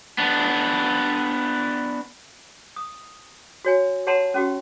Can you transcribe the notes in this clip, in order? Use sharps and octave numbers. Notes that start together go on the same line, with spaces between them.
B3 D4
D#6
F#4 C#5 G#5
G4 C#5 F#5 A5 A#5 C6
C#4 F#4 G4